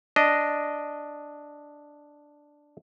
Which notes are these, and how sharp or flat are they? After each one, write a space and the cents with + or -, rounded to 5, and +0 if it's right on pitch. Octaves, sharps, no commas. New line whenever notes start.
D4 +0 D#5 +0